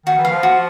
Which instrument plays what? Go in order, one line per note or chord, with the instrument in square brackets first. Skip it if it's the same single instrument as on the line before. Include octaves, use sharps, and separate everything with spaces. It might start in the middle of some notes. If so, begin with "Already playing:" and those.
[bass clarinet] D#3 [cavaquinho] F#4
[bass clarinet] E3
[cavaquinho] F5
[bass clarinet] F3
[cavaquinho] F#4